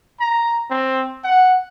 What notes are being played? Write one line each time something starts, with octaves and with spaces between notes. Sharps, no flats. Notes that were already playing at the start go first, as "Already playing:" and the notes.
A#5
C4
F#5